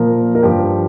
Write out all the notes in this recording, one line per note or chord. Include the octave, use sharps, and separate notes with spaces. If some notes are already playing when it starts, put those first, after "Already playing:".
Already playing: A#2 F3 A#4
A#4
G2 F3 G4